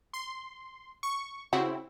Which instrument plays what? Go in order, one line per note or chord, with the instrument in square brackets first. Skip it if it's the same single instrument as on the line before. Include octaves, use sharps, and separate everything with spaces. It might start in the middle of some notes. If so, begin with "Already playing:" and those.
[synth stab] C6
C#6
[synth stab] C#3 C4 E4 [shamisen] F#4